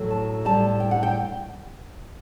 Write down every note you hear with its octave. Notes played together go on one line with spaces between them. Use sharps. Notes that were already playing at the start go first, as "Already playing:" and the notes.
Already playing: A2 F#3 A3
A5
A2 G3 A5
G5
F#5
G5